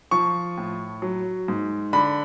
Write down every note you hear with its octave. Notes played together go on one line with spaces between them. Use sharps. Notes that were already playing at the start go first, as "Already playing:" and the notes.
F3 C#6
A2
F#3
G#2
D3 B5